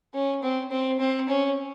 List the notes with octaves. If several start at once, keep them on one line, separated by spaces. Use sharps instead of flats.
C#4
C4
C4
C4
C#4